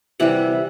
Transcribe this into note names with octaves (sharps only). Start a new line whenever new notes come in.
C3 E3 G3 E5 F#5